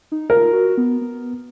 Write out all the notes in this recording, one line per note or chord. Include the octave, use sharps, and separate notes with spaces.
D#4
F4 A#4
F#4
B3
B3